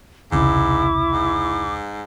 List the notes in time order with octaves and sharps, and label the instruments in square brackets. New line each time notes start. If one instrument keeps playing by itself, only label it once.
[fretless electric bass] E1 C2 C#3 [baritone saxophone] G#2 [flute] E4 [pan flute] D6
[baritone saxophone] G#2